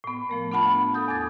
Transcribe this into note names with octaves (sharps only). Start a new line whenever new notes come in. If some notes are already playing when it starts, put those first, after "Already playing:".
A2 B3
F3 A3 A#4
B3 D4 F4 F#5 A5 B5
A4 D#6 G6
E2 D6 G#6 A6